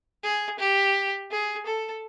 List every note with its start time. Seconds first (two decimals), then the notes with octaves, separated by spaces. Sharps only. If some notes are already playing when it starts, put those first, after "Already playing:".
0.24 G#4
0.60 G4
1.31 G#4
1.66 A4